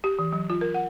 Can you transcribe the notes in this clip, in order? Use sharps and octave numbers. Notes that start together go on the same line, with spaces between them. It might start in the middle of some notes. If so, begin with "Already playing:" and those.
G4
E3
F#3
F4
A#4
F#5